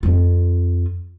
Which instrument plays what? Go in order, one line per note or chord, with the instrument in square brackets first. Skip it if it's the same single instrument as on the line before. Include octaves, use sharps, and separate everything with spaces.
[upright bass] F2 F4